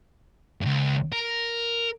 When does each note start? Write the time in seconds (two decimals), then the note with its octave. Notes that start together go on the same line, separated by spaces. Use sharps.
0.61 C#2 G2
1.12 A#4